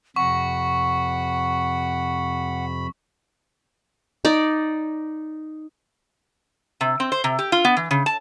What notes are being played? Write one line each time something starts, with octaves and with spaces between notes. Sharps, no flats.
F2 C3 F#5 B5 C#6
D#4 D5
C3
C4
C5
C3
G4
F4
B3
E3
C#3
A5